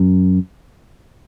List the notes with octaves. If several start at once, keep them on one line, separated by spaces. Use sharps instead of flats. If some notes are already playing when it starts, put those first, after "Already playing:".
Already playing: F#2